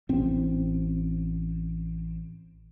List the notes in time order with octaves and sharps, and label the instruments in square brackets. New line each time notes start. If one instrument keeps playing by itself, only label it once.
[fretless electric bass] A1 C4